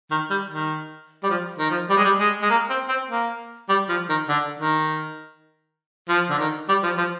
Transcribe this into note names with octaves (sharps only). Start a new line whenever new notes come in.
D#3
G3
D#3
G3
F3
D#3
F3
G3
G#3
G3
G#3
G#3
A#3
C4
C4
A#3
G3
F3
D#3
D3
D#3
F3
D3
D#3
G3
F3
F3